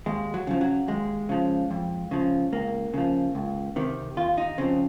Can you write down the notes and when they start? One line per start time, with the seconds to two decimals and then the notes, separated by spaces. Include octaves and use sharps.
0.06 D#2 G#3
0.34 F#3
0.47 C#3 F3
0.61 F#3
0.88 D#2 G#3
1.29 C#3 F3
1.71 F2
2.11 C#3 F3
2.53 C#2 A#3
2.94 C#3 F3
3.35 C#2
3.76 C3 D#3
4.17 D#2 F4
4.38 D#4
4.58 C#3 F3 C4